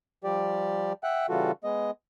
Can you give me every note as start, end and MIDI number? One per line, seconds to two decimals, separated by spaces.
0.24 0.93 53
0.24 0.93 55
0.24 0.93 67
0.24 0.93 74
1.04 1.26 76
1.04 1.26 78
1.04 1.26 79
1.04 1.26 90
1.29 1.52 49
1.29 1.52 52
1.29 1.52 55
1.29 1.52 65
1.29 1.52 66
1.29 1.52 69
1.64 1.91 56
1.64 1.91 59
1.64 1.91 75